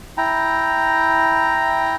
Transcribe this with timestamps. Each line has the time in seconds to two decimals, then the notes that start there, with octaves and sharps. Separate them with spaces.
0.18 E4 G5 A#5